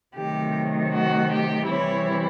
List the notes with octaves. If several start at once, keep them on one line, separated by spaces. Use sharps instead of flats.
C3 D#3 F#3 A3 G4
F#4
G4
C3 E3 G3 C4 E4 C#5